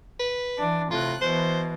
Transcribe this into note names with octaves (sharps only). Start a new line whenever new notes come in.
B4
E3 D4
A2 C3 F4 F#6
B2 E3 C5